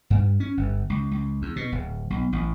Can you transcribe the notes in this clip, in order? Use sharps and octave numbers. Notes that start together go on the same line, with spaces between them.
G2
C#4
G1
C#2
C#2
E2
B2
D1
B1
A1